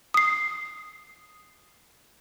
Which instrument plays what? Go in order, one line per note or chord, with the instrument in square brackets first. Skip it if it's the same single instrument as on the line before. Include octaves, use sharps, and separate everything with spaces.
[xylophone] D#6 C7